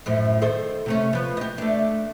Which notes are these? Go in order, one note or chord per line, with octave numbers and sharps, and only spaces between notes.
F#2 A2 F3
D#3 A4 C5
C3 A3 C#4
F3 B3
G4 D#5
A3 D4